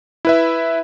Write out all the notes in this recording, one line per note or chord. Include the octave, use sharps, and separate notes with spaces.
E4 B4 E5